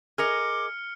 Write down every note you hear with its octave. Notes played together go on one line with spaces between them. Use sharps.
G#4 A#4 D#5 D6 F6 C#7